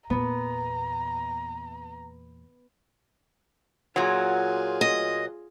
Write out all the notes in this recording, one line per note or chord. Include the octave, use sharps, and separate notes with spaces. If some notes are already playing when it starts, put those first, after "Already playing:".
E2 A#2 B3 A#5
A#2 F#3 F4 G#4
D#5